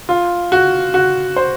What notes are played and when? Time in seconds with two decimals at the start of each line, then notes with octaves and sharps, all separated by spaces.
0.09 F4
0.52 F#4
0.94 F#4
1.36 C5